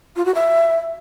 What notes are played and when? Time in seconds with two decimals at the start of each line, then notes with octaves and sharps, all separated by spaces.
0.16 F4
0.25 F#4
0.35 E5